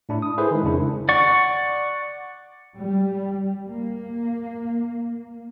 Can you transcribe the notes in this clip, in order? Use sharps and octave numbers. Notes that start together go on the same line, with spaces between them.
A2 D4 E4
D#6
E4 G#4 A4 B4 C5
D#3 G#3
F2 C#3 D4 E4
D5 F#5 C#6
G3
A#3